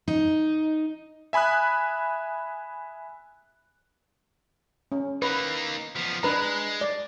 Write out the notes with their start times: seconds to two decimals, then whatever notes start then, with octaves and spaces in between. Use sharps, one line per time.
0.08 D#4
1.33 E5 G#5 B5 D#6 F#6
4.92 C#4
5.22 A#3 D#4 B4
5.96 F3 B3
6.23 G#3 D4 B4 A#5
6.81 D5